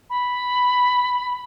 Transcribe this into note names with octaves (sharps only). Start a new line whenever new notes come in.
B5